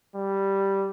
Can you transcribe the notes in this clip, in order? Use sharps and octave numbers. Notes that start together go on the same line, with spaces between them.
G3